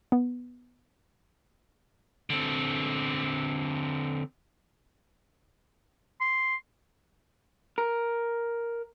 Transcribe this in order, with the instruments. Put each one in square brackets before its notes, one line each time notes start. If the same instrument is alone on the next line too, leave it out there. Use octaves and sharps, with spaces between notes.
[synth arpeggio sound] B3
[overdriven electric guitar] D3 C4
[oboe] C6
[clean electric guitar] A#4